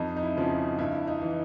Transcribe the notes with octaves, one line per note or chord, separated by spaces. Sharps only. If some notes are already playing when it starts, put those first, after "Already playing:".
Already playing: F2 D#4
D#4
E4
C#3 F3
D#4
G2 E4
D#4
E3